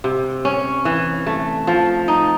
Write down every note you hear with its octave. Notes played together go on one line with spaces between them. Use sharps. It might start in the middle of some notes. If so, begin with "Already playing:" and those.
C3
C#4
E3
A3
F3
D#4